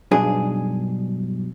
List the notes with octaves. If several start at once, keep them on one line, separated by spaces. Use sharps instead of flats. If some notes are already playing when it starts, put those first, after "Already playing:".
B1 G2 D4 G#4